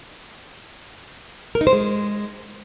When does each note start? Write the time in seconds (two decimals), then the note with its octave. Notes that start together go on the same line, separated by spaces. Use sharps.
1.55 A#4
1.61 D#4
1.67 C5
1.73 G#3